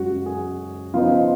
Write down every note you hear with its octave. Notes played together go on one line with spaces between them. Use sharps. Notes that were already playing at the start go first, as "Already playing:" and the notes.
Already playing: F#2 C#3 G#3 F#4
G#4
C#3 F3 B3 D#4 F4